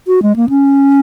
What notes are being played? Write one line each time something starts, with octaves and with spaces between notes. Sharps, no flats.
F#4
G#3
A#3
C#4